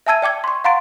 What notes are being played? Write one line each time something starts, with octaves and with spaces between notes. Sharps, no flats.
E5 G#5 A5 E6 G#6 D#7
D5 G5 D6 G#6
C6 C#6
F5 F#5 A#5 C6 A6 D7